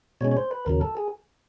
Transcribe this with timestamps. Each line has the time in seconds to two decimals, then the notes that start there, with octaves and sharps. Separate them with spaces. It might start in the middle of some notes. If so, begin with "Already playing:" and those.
0.21 B2 G#3 C#4 C#5
0.32 C#5
0.37 C5
0.51 B4
0.66 D#2 C#3 F#3 A#4
0.81 A4
0.97 G#4